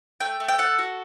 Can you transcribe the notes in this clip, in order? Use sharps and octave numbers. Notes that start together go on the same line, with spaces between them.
A3 G5
A3
G5
A4 F#5
F#4